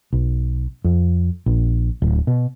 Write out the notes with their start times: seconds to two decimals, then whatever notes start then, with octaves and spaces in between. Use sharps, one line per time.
0.13 B1
0.84 F2
1.46 A#1
2.02 D1
2.27 B2